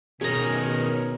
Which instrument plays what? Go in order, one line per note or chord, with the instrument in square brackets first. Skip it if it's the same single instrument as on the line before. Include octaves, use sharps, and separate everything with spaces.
[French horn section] B2 [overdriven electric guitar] D#3 C#4 [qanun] G#4 A#5 [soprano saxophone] A#4